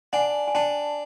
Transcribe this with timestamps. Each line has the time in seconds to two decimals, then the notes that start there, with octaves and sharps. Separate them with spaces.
0.13 D4 F#5 G#5
0.47 G#5
0.54 D4 G5 A5